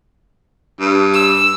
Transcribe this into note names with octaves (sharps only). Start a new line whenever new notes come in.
G2
E6